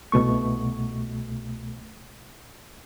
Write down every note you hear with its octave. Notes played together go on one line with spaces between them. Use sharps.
C2 B2 A3 C#6